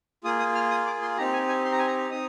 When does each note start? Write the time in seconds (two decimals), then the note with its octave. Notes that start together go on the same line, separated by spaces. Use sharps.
0.24 A#3 F4 G#4 D#6
0.39 D#6
0.55 F6
0.71 D#6
0.87 D6
1.02 C6
1.17 C4 D#4 G4 A#5
1.33 G#5
1.48 G#5
1.65 C6
1.72 A#5
1.79 G#5
1.87 A#5
2.10 C4 D#4 D#6